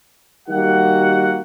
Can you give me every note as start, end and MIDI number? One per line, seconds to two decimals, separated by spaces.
0.49 1.41 51
0.49 1.41 55
0.49 1.41 58
0.49 1.41 66
0.49 1.41 67
0.49 1.41 78